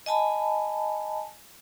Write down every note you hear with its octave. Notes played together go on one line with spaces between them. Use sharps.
D#5 G#5 A5 B5